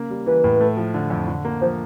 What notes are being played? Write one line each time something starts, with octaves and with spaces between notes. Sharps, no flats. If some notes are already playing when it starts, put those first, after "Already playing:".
Already playing: C#3 A#3
G3
E3 B4
A2
A3
F3
D3
F2
D3
A#3
F3 C5